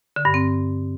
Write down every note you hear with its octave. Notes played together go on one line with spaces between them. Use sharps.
D3
G2
C4